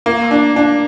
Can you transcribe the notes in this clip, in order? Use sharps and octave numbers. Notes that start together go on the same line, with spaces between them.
A#3
D4
D4